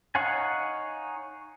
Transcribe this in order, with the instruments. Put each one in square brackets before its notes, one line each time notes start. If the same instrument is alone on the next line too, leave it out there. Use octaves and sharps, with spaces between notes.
[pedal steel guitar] D#4 C#5 F5 F#5 G#5